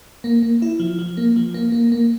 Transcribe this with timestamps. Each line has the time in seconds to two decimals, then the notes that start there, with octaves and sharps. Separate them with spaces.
0.24 A#3
0.43 A#3
0.62 E4
0.80 F3
0.99 F3
1.17 A#3
1.36 F3
1.54 A#3
1.72 A#3
1.92 A#3